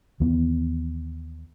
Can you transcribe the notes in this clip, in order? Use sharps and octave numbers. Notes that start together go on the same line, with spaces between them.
D#2 E3 B3